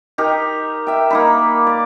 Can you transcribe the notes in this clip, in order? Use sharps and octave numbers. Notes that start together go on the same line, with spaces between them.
D#4 G4 A#4
E5 G5
A#3 D#4 B5
D5